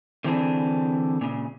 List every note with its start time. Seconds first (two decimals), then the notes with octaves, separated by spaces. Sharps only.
0.24 D3 E3 C4 D4 G#4
1.21 A#2 C#3